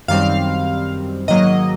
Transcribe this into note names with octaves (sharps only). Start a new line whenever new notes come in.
F#2 D#3 G3 C4 F5
G#2 D#3 F#3 A#3 D#5